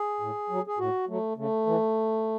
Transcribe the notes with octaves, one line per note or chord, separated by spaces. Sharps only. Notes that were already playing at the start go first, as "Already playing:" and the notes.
Already playing: G#4
A2
F#3
G#4
A2 F#4
F#3 A3
C#3 A3
E3